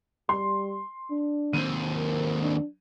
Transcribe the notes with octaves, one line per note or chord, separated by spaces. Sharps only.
G3 C6
D4
D#2 C4 D#7
A#4
D4